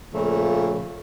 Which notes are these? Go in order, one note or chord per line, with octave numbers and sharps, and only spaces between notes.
A#2 C#3 F3 A3 A#3